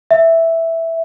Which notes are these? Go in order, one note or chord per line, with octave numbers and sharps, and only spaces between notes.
E5